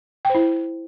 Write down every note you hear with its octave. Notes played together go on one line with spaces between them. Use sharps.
E4 C5 G5